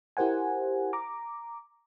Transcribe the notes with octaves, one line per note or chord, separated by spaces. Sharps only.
E4 G4 A#4 C5 F#5 G#5
A#5 D6